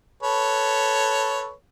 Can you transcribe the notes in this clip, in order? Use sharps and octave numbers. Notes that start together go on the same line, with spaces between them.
A4 B4 C#5